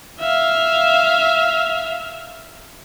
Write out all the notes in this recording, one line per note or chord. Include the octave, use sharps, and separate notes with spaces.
E5 F5